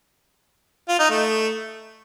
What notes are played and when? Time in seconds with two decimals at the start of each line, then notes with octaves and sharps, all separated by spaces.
0.88 F4
0.99 D#4
1.10 A3